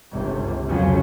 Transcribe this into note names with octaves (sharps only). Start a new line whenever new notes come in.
G1 C#2 C3
C2 F2 C#3 F3 F#3 C#4